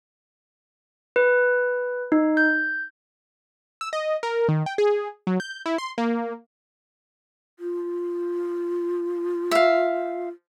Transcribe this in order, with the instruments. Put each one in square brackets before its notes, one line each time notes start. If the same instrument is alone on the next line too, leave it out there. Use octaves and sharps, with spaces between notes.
[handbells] B4
D#4
G6
[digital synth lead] E6
D#5
A#4
D#3
G5
G#4
F#3
G6
E4
C6
A#3
[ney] F4
[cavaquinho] E5 F5